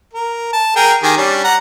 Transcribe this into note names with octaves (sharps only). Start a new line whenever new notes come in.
A#4
A5
G#4 A#4 G5
D#3 G4 G#4
G3 C#4 D4
F#5 A#5